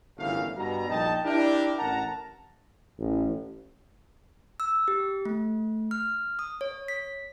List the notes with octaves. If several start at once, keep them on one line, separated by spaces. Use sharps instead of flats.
G1 F#2 A2 E3 A3 F5
G2 B2 A#5
A#1 D#4 D#5 G5 A5
D4 E4 G4 A#4
A1 A#4 F#5 A5 A#5
A1
E6
G4
A3
F6
D#6
C#5
B6